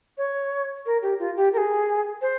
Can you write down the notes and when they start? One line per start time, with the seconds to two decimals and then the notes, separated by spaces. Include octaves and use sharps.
0.18 C#5
0.86 A#4
1.02 G4
1.19 F4
1.37 G4
1.53 A#4
1.58 G#4
2.22 C5